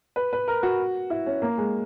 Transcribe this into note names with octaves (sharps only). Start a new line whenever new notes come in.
B4
B4
A#4
F#4
E4
C#4
A#3
G#3